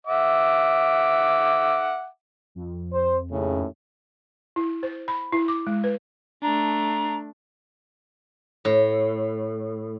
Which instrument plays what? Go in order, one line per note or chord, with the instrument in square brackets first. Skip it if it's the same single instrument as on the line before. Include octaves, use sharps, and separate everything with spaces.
[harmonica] E5 F#5 D6
[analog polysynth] F2
[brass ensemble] C5
D#2 A2 C#3
[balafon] E4
C5
B5
E4
D6
G#3
B4
[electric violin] A3 D4 [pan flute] A#5
[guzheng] A2